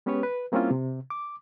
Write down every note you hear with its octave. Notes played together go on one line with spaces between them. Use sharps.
G#3 B3 C#4 G4 B4 C#5
B4
G3 A#3 C4 C#4 E4 F4
C3
D6